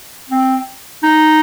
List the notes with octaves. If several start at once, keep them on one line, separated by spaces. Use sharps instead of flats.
C4
D#4